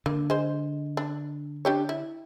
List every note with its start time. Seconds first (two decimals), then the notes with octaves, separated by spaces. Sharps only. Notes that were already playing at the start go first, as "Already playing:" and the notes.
0.06 D3 A#3
0.30 G#3 C5
0.97 D4
1.65 D4 G4 C#5
1.89 E4